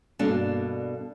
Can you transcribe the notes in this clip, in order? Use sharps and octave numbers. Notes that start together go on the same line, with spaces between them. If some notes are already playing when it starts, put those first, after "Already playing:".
G2 B2 A#3 D4 A4